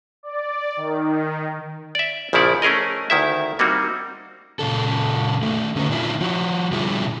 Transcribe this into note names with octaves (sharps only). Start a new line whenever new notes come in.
D5
D#3
D5 E5
A#1 C#3 F3 E4 D5 F#5
A3 C#4 G#4 A#4 D#5
D2 D#3 E4 E5
G3 A#3 C4 D#4 F#4
A#2 C#3 A4
D#3 A3
D3 C#4 F4 A#4 B4 C#5
A#2 D#3 D4 E4 F4
F3 F#4
B2 D3 G3 E4 F4 G#4